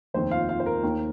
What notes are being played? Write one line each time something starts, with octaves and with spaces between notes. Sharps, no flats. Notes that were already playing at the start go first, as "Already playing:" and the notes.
F1 D#2 D#3 C4 C5
F4 F5
F4 F5
C5
A#4
D#2 D#3 A#3